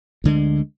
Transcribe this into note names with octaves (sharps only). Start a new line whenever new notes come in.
D2 D3 G#3